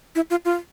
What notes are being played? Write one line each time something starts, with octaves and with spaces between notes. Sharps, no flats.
E4
F4
F4